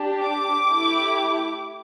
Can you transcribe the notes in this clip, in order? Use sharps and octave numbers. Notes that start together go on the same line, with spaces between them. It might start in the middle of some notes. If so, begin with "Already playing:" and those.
Already playing: D4 G4
D6
A3 E4 G4